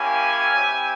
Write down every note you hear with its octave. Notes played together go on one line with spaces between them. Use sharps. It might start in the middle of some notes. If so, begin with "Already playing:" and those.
Already playing: A#3 C#4 E4 G4 G#5
C4 E4 G4